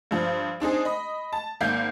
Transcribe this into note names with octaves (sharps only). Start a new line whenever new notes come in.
G2 F3
C4 D4 D#4 G#4
D#5 B5
A5
G#1 A#3 G6